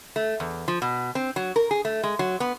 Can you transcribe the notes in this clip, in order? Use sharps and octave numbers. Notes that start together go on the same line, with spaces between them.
A3
E2
F3
B2
C4
F#3
A#4
G#4
A3
G#3
F#3
B3